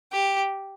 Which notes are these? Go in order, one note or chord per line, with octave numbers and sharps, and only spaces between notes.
G4